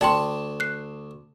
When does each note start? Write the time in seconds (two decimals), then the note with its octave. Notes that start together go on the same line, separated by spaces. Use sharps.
0.01 D2 D4 D5 G5 A5 C6
0.60 F#6 C7